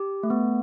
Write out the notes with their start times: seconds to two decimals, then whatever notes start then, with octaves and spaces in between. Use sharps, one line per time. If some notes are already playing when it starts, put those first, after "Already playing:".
Already playing: G4
0.23 A3
0.30 B3